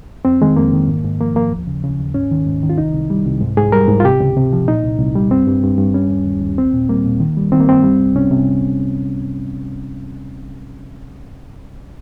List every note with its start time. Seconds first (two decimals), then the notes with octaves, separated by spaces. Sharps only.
0.25 F2 C4
0.42 D#3 G#3
0.56 F2 A#3
0.73 D#3
0.88 G#2
1.04 G#2
1.20 F3 A#3
1.35 F3 A#3
1.51 D#2
1.67 C#3
1.83 C#3
2.00 D#2
2.14 G#2 C#4
2.31 D#3
2.46 G#2
2.63 D#3
2.70 F4
2.78 C2 D#4
2.94 C2
3.10 G3
3.26 C2
3.41 G#2
3.57 G#2 G#4
3.72 G3 A#4
3.88 G#2
4.00 F4
4.04 C3 G4
4.20 C#2
4.37 C3
4.53 F3
4.68 A#2 D#4
4.83 C2
4.99 C2
5.16 G3
5.31 G2 C4
5.47 G2
5.63 G2
5.78 G2
5.94 G3 C#4
6.10 D#2
6.26 D#2
6.41 D#2
6.57 C2 C4
6.73 A#2
6.89 G3 A#3
7.05 A#2
7.20 D#3
7.37 G3
7.52 D#3 C4
7.60 A#3
7.68 G2 C4
7.84 G3
8.00 C2
8.16 C2 C#4
8.31 C3